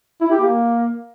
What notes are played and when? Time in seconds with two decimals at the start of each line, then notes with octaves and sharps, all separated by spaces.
0.21 E4
0.31 G4
0.41 A#3